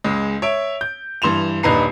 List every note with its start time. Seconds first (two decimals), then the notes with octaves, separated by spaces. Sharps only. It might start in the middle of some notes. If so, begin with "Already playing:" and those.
0.04 C#2 G#3
0.42 C#5 E5 D7
0.81 G6
1.22 G2 E3 C6 E7 F7
1.63 D#1 D4 D#4 B4 A#5 C7